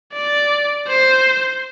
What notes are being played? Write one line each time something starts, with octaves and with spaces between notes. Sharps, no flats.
D5
C5